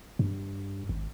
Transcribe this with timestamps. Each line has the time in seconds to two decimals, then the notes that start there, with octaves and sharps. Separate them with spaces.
0.19 G2
0.89 G#1